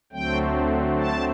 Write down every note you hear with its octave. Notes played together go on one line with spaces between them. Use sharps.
D2 D3 F#3 A3 C4 G5
A5